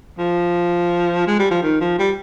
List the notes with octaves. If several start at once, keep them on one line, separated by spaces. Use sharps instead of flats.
F3
G#3
G3
F3
D#3
F3
G3